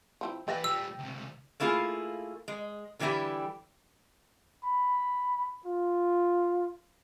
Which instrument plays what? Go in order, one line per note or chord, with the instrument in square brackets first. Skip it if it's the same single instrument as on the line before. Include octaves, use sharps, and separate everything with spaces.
[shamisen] F3 C4 E4
[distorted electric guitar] E3 B4 [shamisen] D5 E5 F5 [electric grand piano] G5 A6 A#6
[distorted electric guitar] A#2 G3 [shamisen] D5 [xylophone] E6
[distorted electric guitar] C#2 C3
[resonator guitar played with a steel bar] A3 A#3 E4 F4 G#4
G#3
D3 E3 G3 B3 E4 G4
[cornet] B5
F4